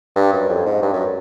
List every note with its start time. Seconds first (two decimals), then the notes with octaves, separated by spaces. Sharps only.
0.16 G2
0.33 F#2
0.49 F2
0.65 G#2
0.82 G2
0.93 F#2